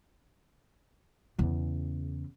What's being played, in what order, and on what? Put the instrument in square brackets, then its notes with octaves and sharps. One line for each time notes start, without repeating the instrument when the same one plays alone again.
[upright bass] E2 C#3